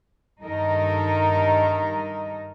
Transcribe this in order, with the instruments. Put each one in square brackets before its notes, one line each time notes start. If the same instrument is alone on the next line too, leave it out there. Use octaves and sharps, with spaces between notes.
[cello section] G2 D#3 D#4 A4 A#4 D#5